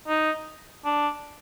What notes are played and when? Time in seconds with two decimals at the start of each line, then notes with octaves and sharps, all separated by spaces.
0.08 D#4
0.85 D4